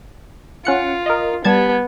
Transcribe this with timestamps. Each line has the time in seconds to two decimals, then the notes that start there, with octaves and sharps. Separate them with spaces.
0.65 C#4 F4 F#5 C#7
1.06 A#4 D#5
1.44 G3 B3 A5 G#6